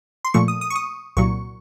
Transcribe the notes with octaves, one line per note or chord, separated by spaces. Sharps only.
C6
A#2 F3 A3 C#6
D#6
D#6
C#6
D#6
C2 A#2 F#3 C#6